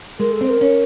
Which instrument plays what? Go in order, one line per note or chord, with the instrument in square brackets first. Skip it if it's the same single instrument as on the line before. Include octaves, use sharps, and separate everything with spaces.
[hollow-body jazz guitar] G#3 [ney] A#4
[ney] A4
[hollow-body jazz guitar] C4 [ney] C5
[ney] A#4
[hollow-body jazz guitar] C#4